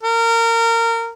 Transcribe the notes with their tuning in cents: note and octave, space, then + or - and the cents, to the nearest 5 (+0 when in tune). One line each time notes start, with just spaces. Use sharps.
A#4 -25